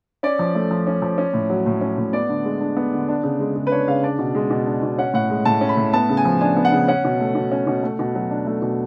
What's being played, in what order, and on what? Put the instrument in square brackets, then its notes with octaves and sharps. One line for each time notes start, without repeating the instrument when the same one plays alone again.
[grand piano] C#4 D5
F3
A3
F3
C#4
F3
C#4
A2
F#3
A2
C#4
A2
B3 D5
D3
G#3
D4
B3
D3
D4
C#3
G#3
C#3
B4
D4 C#5
C#3 F5
D4 D5
B2
G#3
B2
D4
B2
C#4 F#5
A2 F#5
G#3
A2 A5
C#4
B5
A2
B3 A5
C#3
G#5
F3
D4 G#5
B3
F#5
C#3
C#4 F#5
B2
A3
B2
C#4
B2
A3
B2
F#3
D4
A3
B2